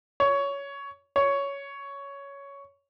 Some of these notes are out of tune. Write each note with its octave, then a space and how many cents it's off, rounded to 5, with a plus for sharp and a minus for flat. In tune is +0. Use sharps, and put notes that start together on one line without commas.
C#5 +15
C#5 +10